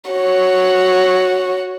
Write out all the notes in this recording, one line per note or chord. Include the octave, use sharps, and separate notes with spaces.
F#4 C#5